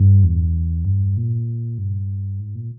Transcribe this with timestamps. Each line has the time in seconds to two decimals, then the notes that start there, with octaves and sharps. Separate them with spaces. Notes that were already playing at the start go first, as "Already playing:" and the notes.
Already playing: G2
0.24 E2
0.85 G2
1.17 A#2
1.78 G2
2.40 G#2
2.55 A#2